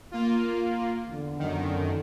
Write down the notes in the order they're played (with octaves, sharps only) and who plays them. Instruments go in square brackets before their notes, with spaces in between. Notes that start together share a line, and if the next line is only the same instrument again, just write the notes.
[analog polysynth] A#3 F4
[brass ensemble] E2 D3
[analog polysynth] F#2 D#3